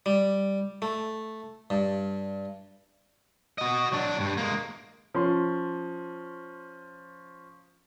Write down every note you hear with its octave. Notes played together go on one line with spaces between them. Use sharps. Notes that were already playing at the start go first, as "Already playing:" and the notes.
G3
A3
G2
F#4 D#5
F#3 D4
G2
G#3 A#3
F3 C#4 C6